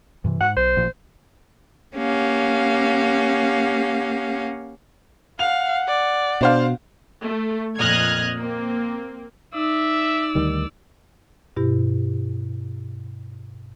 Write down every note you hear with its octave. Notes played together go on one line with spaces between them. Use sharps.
G2 C3 E3
G#2 F#5
B1 C5
A1 A#2 F3
A#3 C#4 G4 F5 F#5
F5 F#5 F7
D5
B2 D4 C5 F5
A3
F2 A#2 D#5 F6 F#6 G#6
A#3 C4
D#4 D5 E5 E6
D2 D#3 G3
G2 B2 E4 G4